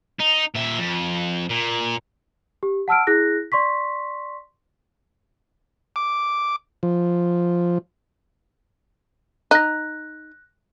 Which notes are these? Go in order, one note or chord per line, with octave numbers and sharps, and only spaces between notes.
D#4
A#2 E5
F2
A#2
G4
F#5 A5 E6 F6 D7
E4 G#4 F#6 A#6
D5 C6 C#6 B6
D6
F3
D#4 F#6 A#6